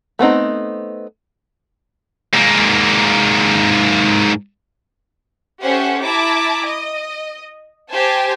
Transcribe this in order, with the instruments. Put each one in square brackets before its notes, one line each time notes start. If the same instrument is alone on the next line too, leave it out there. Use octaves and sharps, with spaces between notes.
[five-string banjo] A3 B3 C4 D#4
[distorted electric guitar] G#2 A#3
[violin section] C#4 G4 A4 C5 E5 F#5
E4 A5 A#5 D6
D#5
G4 C5 G#5 A5